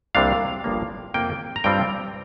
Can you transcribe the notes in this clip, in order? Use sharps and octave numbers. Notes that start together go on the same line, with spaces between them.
C2 C3 G3 A#3 D4 F5
G1 G2 F3 A#3
F2 C3 A#3 F4 G5
A#5
G2 G3 C4 F4 G5